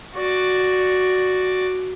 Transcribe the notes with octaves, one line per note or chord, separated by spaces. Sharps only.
F#4 D5